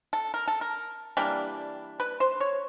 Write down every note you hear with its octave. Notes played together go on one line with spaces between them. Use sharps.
A4
A#4
A4
A#4
E3 G3 A#3 D4
B4
C5
C#5